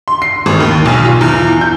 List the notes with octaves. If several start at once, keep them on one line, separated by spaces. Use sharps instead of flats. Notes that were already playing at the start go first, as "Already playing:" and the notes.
C6
C7
G#1
D#2
B1
F4
E2
G6